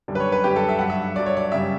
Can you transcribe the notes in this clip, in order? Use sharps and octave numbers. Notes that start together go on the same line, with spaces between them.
F#2 D3 G3
B4
C#5
B4
F#2 D3 G3 G4
A4
E5
G2 F#3 F#5
E5
G2 F#3 D5
C#5
D5
F#2 C#3 G3 E5